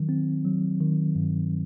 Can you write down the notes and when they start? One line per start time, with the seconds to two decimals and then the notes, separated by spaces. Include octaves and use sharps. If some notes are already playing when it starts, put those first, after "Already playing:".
Already playing: D#3 F#3
0.09 C4
0.45 F#3
0.81 D#3
1.15 G2